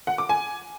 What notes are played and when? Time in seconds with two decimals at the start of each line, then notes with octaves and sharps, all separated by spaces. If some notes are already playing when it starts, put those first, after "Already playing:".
0.07 F#5
0.18 D6
0.29 G#5